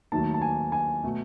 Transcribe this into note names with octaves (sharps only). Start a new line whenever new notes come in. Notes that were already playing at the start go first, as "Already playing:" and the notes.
D#2 D#3 F#3 A3 A5
A5
G#5
G#5
B2 A3